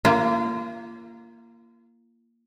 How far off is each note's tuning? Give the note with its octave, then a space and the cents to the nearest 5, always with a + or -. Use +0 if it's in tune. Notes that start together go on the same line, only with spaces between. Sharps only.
A#3 +0 F4 -35